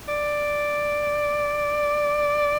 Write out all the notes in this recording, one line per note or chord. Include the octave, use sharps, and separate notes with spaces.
D5